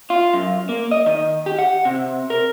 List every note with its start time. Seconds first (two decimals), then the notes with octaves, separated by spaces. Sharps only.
0.10 F4
0.34 F#2
0.69 A#3
0.91 D#5
1.06 D#3
1.46 G4
1.59 F#5
1.85 C3
2.30 A#4